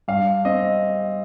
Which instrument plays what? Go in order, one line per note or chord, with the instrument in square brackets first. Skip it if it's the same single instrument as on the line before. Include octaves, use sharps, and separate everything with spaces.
[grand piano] G2 F5
C4 D#5